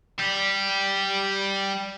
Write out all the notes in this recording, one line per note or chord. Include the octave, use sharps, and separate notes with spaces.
G3